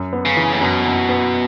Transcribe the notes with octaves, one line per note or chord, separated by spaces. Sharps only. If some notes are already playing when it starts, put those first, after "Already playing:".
Already playing: F#2
B3
C#3
E3
A2
F#2 B2
F#2
B3